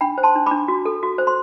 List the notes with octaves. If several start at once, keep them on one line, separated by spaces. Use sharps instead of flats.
D4 G5 B5
C5
A5 C6
D4
D4 B5 D6
F#4
A4
F#4
C5
C6